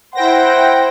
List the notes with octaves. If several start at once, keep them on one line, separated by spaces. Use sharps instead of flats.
E4 C5 F#5 G5 A#6